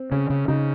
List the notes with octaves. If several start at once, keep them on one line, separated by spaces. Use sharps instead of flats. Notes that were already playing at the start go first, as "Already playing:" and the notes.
Already playing: C4
C#3 C#4
C#3
C#3 D#4